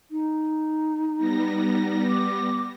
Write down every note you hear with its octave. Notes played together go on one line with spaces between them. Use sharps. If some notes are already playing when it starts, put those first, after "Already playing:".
D#4
G3 B3 A#6
D6